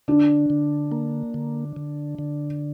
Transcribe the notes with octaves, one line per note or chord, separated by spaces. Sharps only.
D3 D4
D3
A#3
D3
D3
D3